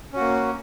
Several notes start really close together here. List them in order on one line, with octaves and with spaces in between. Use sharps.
C#4 F#4 A#3